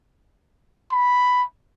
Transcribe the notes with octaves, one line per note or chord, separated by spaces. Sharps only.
B5